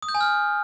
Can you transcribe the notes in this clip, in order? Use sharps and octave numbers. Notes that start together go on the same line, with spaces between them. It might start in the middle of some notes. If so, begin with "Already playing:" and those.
D#6
G6
G#5
F6